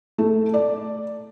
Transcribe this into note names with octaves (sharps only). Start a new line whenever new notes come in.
A3
D5